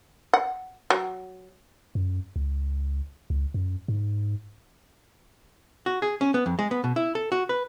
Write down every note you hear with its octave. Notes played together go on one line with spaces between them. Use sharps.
F#5
F#3
F#2
C#2
C#2
F#2
G#2
F#4
G#4
C#4
B3
F2
G#3
B3
B2
E4
A4
F#4
B4